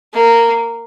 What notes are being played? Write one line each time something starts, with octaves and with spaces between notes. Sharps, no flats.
A#3